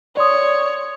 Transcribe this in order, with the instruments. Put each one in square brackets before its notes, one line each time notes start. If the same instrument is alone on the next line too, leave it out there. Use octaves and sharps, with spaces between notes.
[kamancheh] C#5 [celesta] D5 C6 D#6